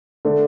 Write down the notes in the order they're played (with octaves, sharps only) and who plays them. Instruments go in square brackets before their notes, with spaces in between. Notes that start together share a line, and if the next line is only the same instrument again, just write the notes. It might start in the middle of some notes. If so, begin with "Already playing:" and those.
[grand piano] D3 A3 D4